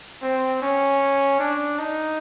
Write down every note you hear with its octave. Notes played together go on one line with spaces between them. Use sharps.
C4
C#4
D4
D#4